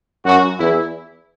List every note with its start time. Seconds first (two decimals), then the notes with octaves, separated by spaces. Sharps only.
0.25 F#2 F#4
0.59 E2 E4